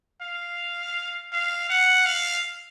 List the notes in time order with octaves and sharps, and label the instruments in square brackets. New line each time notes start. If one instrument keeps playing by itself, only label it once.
[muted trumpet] F5
F5
F#5
F5